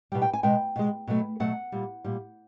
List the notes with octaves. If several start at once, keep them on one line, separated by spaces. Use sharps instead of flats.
B2 G3 G5
G5
G#5
B2 G#3 G5
B2 G#3
B2 F#3 A3
B2 F#3 A3 F#5
A#2 G3
A#2 G3